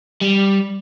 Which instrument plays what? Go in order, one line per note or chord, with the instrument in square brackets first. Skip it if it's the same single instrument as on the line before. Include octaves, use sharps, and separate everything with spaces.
[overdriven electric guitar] G3